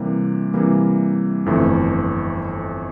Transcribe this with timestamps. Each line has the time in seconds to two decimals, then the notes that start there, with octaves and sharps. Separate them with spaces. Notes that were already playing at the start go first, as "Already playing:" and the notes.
Already playing: C3 E3 G3 A#3
0.54 C3 E3 G3 A#3
1.46 G1 F2 E3 A3